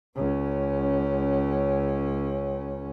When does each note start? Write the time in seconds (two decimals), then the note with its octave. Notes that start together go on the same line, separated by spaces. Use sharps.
0.16 C#2 C#4